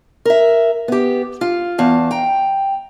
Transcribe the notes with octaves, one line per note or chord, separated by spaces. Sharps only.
A#4 E5
B3 G4
F4
E2 F5 A5
G5 A#5